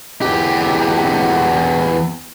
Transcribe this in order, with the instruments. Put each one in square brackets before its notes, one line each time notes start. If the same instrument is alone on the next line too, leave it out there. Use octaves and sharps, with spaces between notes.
[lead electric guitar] E2 G4